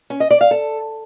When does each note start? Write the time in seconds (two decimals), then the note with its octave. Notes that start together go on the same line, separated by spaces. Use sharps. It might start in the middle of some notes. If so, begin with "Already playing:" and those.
0.10 C#4
0.20 D#5
0.31 D5
0.41 F5
0.51 A4